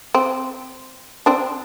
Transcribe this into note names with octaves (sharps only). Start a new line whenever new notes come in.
C4
C4 D4